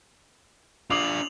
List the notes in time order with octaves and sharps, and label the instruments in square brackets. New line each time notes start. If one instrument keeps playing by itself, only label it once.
[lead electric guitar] D4 F4 [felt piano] D6 D#6 C7 [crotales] F7 F#7